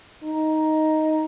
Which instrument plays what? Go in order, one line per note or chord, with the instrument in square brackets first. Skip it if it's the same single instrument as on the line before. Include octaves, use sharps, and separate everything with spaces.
[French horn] D#4